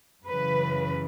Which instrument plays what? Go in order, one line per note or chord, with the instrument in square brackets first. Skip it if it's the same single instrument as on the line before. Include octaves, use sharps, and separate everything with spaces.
[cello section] F#2 C#3 E3 B4